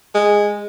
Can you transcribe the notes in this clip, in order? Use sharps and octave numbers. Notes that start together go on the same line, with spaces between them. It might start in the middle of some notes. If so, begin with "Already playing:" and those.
G#3